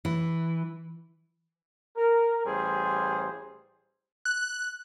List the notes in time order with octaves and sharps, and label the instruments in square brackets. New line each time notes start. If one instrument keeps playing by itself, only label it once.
[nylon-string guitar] E3
[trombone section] A#4
A1 G3 G#4 C5
[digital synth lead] F#6